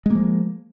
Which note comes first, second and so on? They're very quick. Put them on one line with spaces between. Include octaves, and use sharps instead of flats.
G#3 A#3 F3